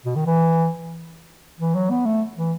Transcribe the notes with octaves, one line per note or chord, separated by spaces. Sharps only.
B2
D#3
E3
E3
F#3
B3
A3
E3